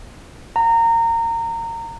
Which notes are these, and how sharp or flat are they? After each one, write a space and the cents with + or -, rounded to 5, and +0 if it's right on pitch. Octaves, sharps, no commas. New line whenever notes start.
F#5 +0 A#5 -25